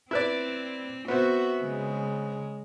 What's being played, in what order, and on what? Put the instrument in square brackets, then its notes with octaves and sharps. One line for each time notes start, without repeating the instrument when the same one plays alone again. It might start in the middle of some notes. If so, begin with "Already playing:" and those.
[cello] C4 [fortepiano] E4 B4 D5
[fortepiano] B3 C4 [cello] F#4 E5
[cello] C#3 G#3